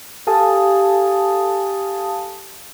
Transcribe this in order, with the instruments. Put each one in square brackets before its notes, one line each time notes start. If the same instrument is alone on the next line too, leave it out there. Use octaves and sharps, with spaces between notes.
[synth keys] G4 A4 F5 G#5 A5 D#6